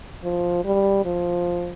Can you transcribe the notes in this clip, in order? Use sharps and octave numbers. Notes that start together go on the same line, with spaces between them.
F3
G3
F3